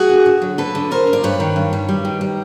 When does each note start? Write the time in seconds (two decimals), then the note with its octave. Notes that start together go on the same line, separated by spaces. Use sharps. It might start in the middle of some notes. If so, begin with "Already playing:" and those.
Already playing: F#4 G#4
0.09 D3
0.26 D3
0.42 F#3
0.58 D3 A4 B4
0.75 D3
0.91 D3 A#4 C5
1.07 D3
1.13 D5
1.23 G2 B4 C#5
1.40 D#3
1.56 G2
1.73 G3
1.89 G3
2.05 D#3
2.21 G3